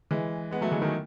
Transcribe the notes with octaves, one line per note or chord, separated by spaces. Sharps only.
E3 G#3
G#3 B3
F#3 A3
E3 G#3
D#3